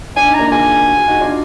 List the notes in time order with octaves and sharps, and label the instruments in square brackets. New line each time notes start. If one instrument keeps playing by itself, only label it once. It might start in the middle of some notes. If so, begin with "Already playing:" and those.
[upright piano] D4 [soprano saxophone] G#5
[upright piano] D#4
[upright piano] A#3 D4 [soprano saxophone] A#5
[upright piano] F4 G#4 [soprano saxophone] G#5
[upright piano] F#4
G#4
D#4 F#4
D4 F4